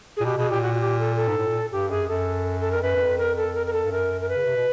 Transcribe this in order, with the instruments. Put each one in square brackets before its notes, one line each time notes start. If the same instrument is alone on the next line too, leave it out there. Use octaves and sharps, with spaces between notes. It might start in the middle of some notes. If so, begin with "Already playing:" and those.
[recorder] G#4
[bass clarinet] A#2
[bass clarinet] B2 [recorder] G4
[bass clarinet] B2 [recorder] G#4
[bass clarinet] A#2 [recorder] G4
[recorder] F#4
F#4
G4
A4
A4
[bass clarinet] G#2
A2
A#2
[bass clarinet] G2 [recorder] G4
[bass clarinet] F#2 [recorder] G#4
[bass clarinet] F#2 [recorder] A4
[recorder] A4
[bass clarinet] F2 [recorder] A#4
[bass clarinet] F#2 [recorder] B4
[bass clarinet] F#2
F2
[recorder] A#4
A4
A#4
A#4
A4
[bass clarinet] G2
[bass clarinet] F#2 [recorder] A#4
[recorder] A#4
B4
[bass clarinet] C#3
C3
B2